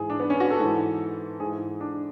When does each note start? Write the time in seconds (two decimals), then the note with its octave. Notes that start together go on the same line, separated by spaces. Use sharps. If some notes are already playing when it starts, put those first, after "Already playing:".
Already playing: G#2 E3 G#4
0.10 D4
0.20 B3
0.30 C#4
0.40 F#4
0.51 A4
0.60 G#2 E3
1.40 G#2 E3 G#4
1.81 D4